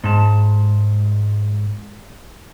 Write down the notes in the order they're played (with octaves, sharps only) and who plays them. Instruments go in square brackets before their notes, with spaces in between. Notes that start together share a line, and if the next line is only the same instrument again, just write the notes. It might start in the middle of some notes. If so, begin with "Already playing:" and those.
[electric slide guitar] G#2 A5